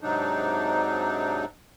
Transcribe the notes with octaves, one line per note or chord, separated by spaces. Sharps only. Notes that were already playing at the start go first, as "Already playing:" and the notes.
G#2 C3 F#3 D4 D#4